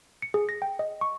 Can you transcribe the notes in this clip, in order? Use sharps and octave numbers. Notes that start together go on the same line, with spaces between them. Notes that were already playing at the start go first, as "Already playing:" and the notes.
C#7
G#4
A#6
G5
D#5
C#6